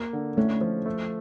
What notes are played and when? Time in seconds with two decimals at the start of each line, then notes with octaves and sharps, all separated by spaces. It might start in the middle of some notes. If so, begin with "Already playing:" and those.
Already playing: A#3
0.13 D3
0.37 A3 C#4
0.61 F3
0.86 A3